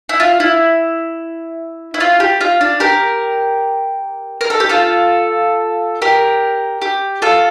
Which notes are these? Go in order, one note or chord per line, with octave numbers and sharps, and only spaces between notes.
E4
F4
E4
E4
F4
G4
F4
D4
G4 A#4
A#4
A4
G4
F4 A4
G4 A#4
G4
F4 A4